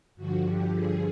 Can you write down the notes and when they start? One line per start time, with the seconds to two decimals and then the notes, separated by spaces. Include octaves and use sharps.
0.16 G2 D3 F3 F#4
0.45 G4
0.75 G#4